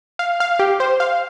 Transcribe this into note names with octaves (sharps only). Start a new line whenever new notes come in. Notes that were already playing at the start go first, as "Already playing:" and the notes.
F5
F5
G4
C5
F5